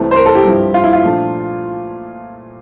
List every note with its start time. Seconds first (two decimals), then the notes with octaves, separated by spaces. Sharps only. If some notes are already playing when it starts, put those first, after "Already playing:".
Already playing: C2 C3 E3 A3 C4
0.11 C5
0.16 A#4
0.26 A4
0.35 G4
0.45 G2 F3 C4 E4
0.74 F4
0.84 E4
0.93 F4
1.03 A#2 F3 A3 D4